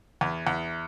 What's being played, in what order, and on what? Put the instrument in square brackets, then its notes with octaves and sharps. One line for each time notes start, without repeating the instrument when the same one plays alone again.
[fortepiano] E2
E2